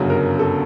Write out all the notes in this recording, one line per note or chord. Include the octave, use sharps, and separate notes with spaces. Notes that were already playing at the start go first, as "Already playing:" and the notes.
Already playing: G1 F#2 C#3 F#3
A#4
A4